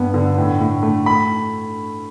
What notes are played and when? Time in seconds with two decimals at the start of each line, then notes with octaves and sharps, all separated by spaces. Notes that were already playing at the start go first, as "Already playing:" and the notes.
Already playing: G2 B3
0.14 D3
0.38 A2
0.60 A2
0.83 A3
1.06 B5